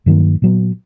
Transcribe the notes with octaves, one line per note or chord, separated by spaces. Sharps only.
G2 D#3 F#3 A#3
A#2 F#3 B3